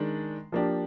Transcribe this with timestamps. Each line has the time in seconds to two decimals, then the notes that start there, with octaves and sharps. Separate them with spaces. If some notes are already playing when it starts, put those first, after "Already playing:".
Already playing: D#3 G#3 D4
0.52 F3 A#3 D4 G4